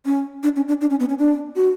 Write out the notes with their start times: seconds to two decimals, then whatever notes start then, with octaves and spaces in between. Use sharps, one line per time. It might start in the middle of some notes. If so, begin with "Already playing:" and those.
0.06 C#4
0.43 D4
0.56 C#4
0.68 D4
0.81 D4
0.90 C#4
1.00 B3
1.09 C#4
1.19 D4
1.56 F#4